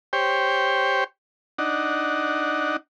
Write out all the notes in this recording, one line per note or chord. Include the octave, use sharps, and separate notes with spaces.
G4 C5 C#5 G5
D4 D#4 F#5